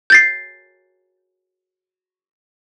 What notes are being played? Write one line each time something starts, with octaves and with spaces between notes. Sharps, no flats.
G6 A6 C7